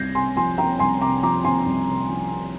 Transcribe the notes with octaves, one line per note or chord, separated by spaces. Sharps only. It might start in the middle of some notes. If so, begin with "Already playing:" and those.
Already playing: C2 C4 G6 G#6 A#6 C7
C3 G#5 C6
F3 G#5 C6
C4 G5 A#5
C2 G#5 C6
C3 A#5 D6
F3 A#5 D6
C4 G#5 C6
C2
C3
F3
C4